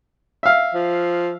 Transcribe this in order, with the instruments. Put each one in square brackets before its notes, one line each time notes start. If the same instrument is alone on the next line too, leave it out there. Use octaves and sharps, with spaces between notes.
[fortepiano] E5 F5
[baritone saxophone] F3